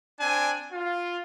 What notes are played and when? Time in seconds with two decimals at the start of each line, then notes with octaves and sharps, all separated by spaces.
0.20 C4 D4 G#5
0.73 F4